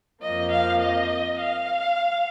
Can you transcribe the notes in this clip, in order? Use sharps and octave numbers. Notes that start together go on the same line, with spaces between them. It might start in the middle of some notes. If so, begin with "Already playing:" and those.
F2 F3 A#3 D#5
F5
D#5
F5